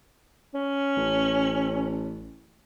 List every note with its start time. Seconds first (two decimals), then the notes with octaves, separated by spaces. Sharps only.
0.55 C#4
0.96 A1